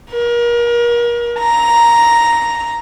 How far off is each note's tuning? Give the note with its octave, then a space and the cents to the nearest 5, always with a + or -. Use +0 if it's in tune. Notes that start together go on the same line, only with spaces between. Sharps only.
A#4 +35
A#5 +5